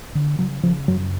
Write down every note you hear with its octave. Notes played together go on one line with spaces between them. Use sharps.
D3
C#3 F#3
C#3 F3
F#2 F#3